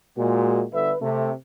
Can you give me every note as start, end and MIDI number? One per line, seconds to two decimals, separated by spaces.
0.17 0.63 46
0.17 0.63 56
0.17 0.62 66
0.73 0.92 31
0.73 0.92 50
0.73 0.98 71
0.73 0.92 76
1.01 1.32 48
1.01 1.30 57